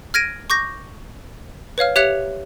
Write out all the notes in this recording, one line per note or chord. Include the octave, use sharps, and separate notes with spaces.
F6 G#6 A#6 D7 D#7
C#6 D6 G6 A#6
B4 C#5 F5 F6
G4 C#5 E5 F#6 C#7 F7